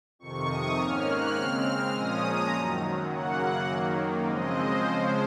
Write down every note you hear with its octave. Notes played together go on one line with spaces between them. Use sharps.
F2 C3 D#3 C#6
D#6
G#2 D#3 A#3 C#4 F6
F#6
C#3 G#3 C4 F6
A#2 F3 G#3 C#4 D#6
A#5
F#2 D#3 F#3
F#2 C#3 F#3 A#3 F#5
F#2 D#3 F#3 A#3
C#3 F3 G#3 C4 D#5
C5
C#3 F3 G#3